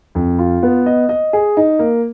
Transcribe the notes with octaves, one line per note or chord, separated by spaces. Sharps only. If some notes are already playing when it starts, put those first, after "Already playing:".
F2
F4
B3
D#5
D#5
G#4
D#4
A#3